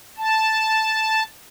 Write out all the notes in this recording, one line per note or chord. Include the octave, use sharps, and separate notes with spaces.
A5